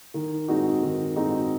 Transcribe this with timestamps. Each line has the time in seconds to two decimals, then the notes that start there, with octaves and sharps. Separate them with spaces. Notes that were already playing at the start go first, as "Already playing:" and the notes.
0.14 D#3
0.48 G#3 C4 D#4 F#4
0.82 D#3
1.16 G#3 C4 D#4 F#4